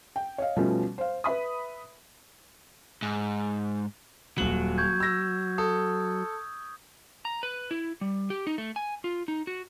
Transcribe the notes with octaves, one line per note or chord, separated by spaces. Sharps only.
G5
C#5 D#5 F5
B2 F3 G3 A3 C#4
C5 F5
B4 E5 B5 D#6
G#2
D#1 F#3 F#7
C#6 G6 G#6
E6 A#6
A4 D#6
A#5
B4
E4
G3
G4
D#4
A3
G#5
F4
D#4
F#4